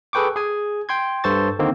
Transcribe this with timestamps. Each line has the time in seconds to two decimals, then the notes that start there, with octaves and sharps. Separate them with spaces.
0.13 G#4 A4 B4 G5 C#6 D6
0.36 G#4 G#5
0.89 G5 C6 G#6
1.24 G2 A4 C5 A5 C#6 A6
1.59 D3 D#3 A#3 C4